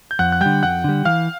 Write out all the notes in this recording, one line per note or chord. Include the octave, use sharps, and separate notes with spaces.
G6
F2 F#5 F#6
F#6
D3 G3 G5 G6
F2 F#5 F#6
D3 G3
E3 F5 F6